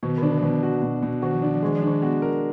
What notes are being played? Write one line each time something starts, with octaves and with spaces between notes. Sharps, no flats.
B2 D#3
D3
D#3 D4
D3
F3
B2 D#3
F#4
B2
B2
D#3 F#4
F3
D#3 D4
F3
D#3 G#3
F3
D#3 D4
B3 F#4
A#4